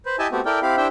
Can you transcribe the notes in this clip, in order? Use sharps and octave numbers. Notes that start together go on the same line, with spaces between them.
B4 C5
E4 G4 D#5 E5 G#5 A5
A3 B3 C4 F#4 G4
E4 A4 A#4 D5 G5
C4 E4 G4 F5 B5
D4 E4 G4 C5 E5 G5